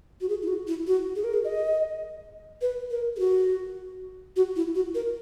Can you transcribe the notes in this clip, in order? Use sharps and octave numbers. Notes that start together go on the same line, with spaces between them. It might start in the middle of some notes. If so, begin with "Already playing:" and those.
F#4
G#4
E4
F#4
E4
F#4
G#4
A#4
G#4
D#5
B4
A#4
G#4
F#4
F#4
E4
F#4
A#4